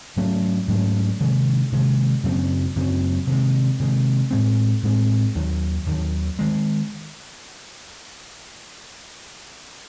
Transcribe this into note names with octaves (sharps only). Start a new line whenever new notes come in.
G#2 F#3 A3 C#4
G#2 F#3 A3 C#4
C3 D#3 G#3
C3 D#3 G#3
F#2 C#3 F#3 C4
F#2 C#3 F#3 C4
C3 D#3 G#3
C3 D#3 G#3
A2 G#3 C4
A2 G#3 C4
D#2 D#3 F#3
D#2 D#3 F#3
D#3 G#3